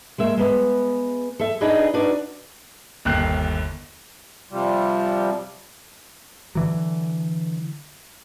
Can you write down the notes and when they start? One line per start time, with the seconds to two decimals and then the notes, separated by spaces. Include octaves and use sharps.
0.18 G#3 A#3 E5
0.37 G#3 B3
1.40 A4 E5
1.61 D4 D#4 G#4 B4 D5 D#5
1.94 D4 D#4 F#4 B4 D5
3.05 G1 D#2 F#6 C7
4.51 C3 F3 G3
6.55 D3 E3 F#3